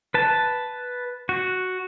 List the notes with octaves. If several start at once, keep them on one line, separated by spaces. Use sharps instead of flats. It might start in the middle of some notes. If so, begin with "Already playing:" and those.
B4 A5
F#4